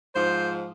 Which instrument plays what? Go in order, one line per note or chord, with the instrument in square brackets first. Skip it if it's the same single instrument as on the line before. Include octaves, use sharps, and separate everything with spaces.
[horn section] G#2 F3 C5